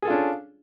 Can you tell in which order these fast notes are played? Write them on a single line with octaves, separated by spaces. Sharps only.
G#4 A4 F4 D4 C#4